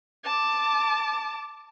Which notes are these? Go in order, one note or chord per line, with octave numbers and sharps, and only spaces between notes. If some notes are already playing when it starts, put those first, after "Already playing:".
A5 D6